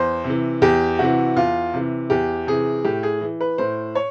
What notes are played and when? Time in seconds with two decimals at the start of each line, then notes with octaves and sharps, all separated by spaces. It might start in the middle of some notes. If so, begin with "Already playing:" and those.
Already playing: E2 C5
0.24 C3
0.30 E3
0.62 E2 G4
0.99 C3 E3 F#4
1.36 E2 F4
1.74 C3 E3
2.10 E2 G4
2.47 C3 E3 G#4
2.84 A2 G4
3.03 G#4
3.21 E3
3.41 B4
3.58 A2 C5
3.95 C#5